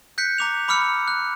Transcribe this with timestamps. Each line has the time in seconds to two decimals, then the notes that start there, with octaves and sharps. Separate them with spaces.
0.18 F#6 G6 B6 C#7
0.38 A#5 D6 F7
0.68 B5 D6 E6 F6 C#7
1.08 F#6